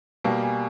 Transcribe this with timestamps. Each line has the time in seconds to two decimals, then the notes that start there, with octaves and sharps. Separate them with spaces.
0.25 B2 G3 A#3 G5
0.43 G#5